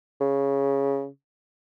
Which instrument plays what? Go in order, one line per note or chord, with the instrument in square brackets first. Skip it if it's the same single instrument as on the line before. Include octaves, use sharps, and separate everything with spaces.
[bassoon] C#3